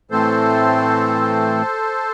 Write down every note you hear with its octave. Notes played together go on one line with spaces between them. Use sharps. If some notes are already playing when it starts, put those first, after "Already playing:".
A2 E3 A3 C4 A4 C5